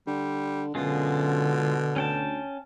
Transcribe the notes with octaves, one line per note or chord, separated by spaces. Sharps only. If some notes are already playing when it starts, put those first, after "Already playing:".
D3 G3
F#2 B2 D3 G#3 F4
D2 C#4 G5 A5